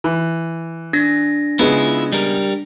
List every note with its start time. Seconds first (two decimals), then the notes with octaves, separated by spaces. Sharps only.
0.04 E3
0.93 D4 A#6
1.59 C#3 G#3 B3 E4 F4
2.12 G3 A#4